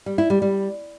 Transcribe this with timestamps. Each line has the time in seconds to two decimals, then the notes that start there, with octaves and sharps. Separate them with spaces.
0.06 G3
0.18 E4
0.30 G3
0.42 G3